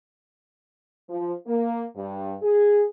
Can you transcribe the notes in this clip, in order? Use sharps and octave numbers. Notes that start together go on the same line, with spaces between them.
F3
A#3
G2
G#4